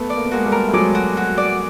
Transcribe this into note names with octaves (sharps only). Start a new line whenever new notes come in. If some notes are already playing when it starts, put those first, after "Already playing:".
Already playing: A3 B3
D5
A#3
B3
G#3 A#3 F#4
G3 A3
A#4
A3
F#3 G#3 D5
F#4
F#4
D5